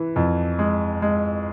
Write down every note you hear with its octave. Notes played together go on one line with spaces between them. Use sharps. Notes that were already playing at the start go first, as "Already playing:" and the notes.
Already playing: E3
F2
G#3
G#3